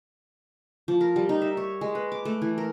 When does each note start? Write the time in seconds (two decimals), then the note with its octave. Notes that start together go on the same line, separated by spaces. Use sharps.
0.88 F3
1.01 A#4
1.16 G3
1.29 D#4
1.42 E5
1.57 C#5
1.81 G#3
1.95 B4
2.12 D6
2.25 A3
2.42 E3
2.58 A#4